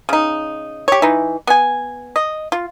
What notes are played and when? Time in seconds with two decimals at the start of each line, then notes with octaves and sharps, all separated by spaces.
0.09 C#3 D#4
0.88 G4 C#5
1.02 E3 D#4
1.47 B3 G#5
2.16 D#5
2.52 F4